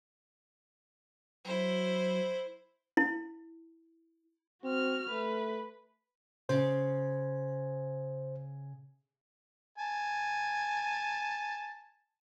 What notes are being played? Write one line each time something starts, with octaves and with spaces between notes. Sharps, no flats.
F#3 E4 C5
E4
C4 F#4 F6
A3 B4
C#3 C5
G#5 A5